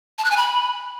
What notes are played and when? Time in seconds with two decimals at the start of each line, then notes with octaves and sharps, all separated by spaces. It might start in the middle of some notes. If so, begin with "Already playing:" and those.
0.18 A5
0.25 F#6
0.31 G#5
0.37 B5